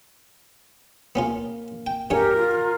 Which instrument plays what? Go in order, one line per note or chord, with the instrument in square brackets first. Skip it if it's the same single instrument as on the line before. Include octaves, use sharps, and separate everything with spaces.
[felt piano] A#3 [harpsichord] B3 C#4 F4
[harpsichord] G5
[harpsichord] G2 C#4 C#5 [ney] G4 [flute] A#4
[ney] F4